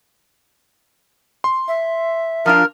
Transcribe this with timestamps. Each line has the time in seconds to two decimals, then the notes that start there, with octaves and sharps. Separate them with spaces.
1.44 C6
1.68 E5
2.46 F3 D4 F4 A#4